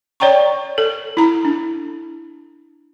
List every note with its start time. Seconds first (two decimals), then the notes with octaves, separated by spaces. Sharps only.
0.20 C#5 D5 G5 A#5 C#6
0.78 A4
1.17 E4 A#5
1.45 D4